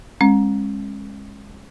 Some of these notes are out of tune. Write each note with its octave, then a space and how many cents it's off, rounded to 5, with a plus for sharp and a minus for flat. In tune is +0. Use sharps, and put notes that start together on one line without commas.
G#3 -15 C#4 -35